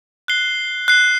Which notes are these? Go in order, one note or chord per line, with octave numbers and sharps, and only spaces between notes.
F#6 C7 G7
F#6 C7 G7